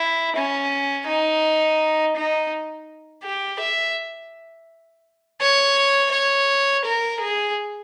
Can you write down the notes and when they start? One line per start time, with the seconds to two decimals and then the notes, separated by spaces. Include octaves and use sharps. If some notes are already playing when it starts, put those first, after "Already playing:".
Already playing: E4
0.36 C#4
1.07 D#4
2.16 D#4
3.23 G4
3.60 E5
5.41 C#5
6.12 C#5
6.85 A#4
7.20 G#4